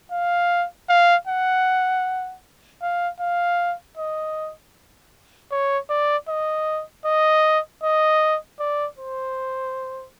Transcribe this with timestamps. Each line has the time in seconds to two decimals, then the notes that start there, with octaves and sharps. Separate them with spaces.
0.12 F5
0.89 F5
1.28 F#5
2.82 F5
3.20 F5
3.98 D#5
5.52 C#5
5.90 D5
6.29 D#5
7.06 D#5
7.83 D#5
8.60 D5
8.99 C5